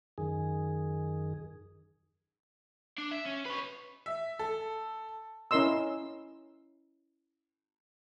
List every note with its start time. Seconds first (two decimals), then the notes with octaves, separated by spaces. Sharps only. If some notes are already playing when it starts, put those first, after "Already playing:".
0.18 F#2 D#3 G#4
2.98 D4
3.12 E5
3.25 C#4
3.45 B4 C#5
4.06 E5
4.39 A4
5.51 C#4 E4 A#4 D#5 C6 E6